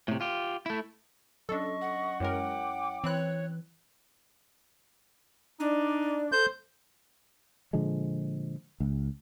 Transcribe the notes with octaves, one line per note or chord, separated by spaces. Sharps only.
A2 C3
F4 G4
A3 E4
F#3 C#4 D4 A4 D#5 C#6
F#5
F#2 G#3 E4 A#4 C#5 G5 D6
E3 C4 E4 C#5 F#6
D4 D#4 D5
A4 C5 G6
A#2 D3 F3 G#3
C#2